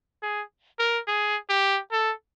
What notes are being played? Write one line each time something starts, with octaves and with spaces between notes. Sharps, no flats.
G#4
A#4
G#4
G4
A4